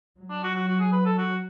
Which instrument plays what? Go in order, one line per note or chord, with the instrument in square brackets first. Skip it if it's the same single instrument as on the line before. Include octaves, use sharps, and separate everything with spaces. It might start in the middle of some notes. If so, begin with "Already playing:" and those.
[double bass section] F#3
[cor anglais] D4
F#4
F#4
F#4
G#4
B4
A4
F#4